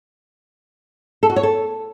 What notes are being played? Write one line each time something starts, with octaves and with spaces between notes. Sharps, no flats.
A4
F#4
C#5
A4